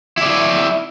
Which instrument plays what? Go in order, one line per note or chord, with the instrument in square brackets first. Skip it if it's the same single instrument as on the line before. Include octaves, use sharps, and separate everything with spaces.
[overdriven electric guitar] E4 D5